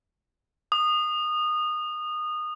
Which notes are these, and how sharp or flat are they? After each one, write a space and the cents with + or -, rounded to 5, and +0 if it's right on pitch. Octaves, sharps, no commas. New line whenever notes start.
D#6 -20